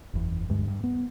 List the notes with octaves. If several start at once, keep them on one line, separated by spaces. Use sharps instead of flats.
F#1 E2
D2 G2 G#3
G2
B3